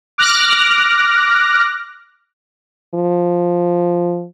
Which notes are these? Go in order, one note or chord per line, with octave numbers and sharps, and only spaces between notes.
D6 F6 F#6 A#6
F3